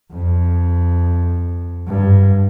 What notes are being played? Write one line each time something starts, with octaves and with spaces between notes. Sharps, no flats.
F2
G2